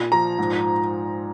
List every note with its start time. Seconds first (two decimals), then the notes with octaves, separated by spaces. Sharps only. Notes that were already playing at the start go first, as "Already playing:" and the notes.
Already playing: A#2
0.12 F3 A#5
0.39 G#2